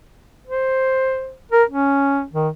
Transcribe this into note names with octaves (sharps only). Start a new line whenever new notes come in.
C5
A#4
C#4
D#3